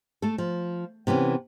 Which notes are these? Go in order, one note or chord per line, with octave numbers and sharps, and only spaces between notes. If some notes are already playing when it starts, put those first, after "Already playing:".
A3 A4
F3
C3 E3 B3 C#4